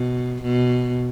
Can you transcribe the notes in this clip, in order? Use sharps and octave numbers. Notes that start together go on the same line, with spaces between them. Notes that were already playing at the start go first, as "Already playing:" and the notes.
Already playing: B2
B2